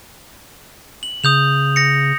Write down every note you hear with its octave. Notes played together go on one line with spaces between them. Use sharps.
F#7
C#3 D#6 G6 F7
A#6 C#7